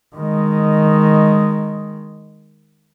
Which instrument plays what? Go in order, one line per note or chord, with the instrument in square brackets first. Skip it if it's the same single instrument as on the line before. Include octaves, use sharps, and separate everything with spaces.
[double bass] D#3 G#3